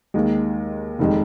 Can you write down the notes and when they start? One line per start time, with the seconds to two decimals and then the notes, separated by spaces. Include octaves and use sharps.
0.14 D#2 D#3 G#3
0.99 F1 D#3 G#3